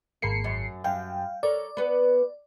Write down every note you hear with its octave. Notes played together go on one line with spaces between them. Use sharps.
G#1 A#3 C7 C#7
F#2
F#2 F5 G5
A4 A#4 C#5 D5
B3 B4